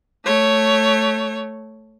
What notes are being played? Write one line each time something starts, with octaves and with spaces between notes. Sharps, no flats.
A3 C#5